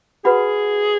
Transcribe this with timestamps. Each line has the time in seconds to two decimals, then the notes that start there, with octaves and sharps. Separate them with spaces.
0.25 F#4 G#4 B4 F#5 B5